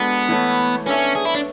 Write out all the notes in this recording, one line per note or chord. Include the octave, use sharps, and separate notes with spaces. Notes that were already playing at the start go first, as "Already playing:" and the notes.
Already playing: G#3 B3 D4 F#4 A4
E3 A3 E4 A4 C#5
B3 C#4 D4 A4 C#5 E5
G#4
E4
D4